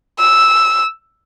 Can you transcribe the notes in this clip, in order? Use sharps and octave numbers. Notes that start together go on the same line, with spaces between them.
E6